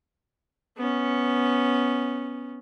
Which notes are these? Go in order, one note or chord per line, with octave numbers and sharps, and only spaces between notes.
B3 C#4